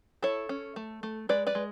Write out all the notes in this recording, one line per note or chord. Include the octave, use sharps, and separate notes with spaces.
E4 A4 C#5
C#4
A3
A3
G#3 B4 D5
B4 D5
G#3